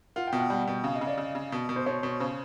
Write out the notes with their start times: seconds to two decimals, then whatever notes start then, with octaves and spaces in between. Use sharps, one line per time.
0.16 F4 F#5
0.27 G5
0.32 B2
0.38 F#5
0.50 G3 F#5
0.67 B2
0.84 C#3 F5
0.95 D#5
1.01 C#3
1.07 D5
1.17 C#3
1.35 C#3
1.52 B2
1.69 B2
1.76 C5
1.86 B2 C#5
2.03 B2
2.20 C#3 C5